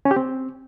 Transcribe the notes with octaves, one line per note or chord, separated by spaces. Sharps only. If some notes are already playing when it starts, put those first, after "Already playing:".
C#4
G4
C4